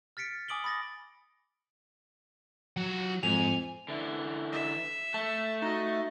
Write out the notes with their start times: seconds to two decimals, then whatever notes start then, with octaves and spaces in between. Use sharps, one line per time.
0.17 F6 A6 B6 C#7 D7
0.48 G#5 D6 D#6 D7 F#7 G7
0.64 B5 D#6 A6 A#6
2.77 F#3 F4 F#5
3.23 F2 G#2 G#5 F7
3.88 D3 E3
4.52 E5
5.14 A3 A5
5.62 D#4 F#4 D#5